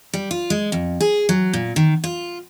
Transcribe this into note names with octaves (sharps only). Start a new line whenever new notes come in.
G3
F4
G#3
F2
G#4
F#3
A#2
D#3
F4